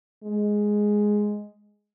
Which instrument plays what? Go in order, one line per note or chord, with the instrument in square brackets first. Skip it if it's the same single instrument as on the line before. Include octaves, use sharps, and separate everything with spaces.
[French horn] G#3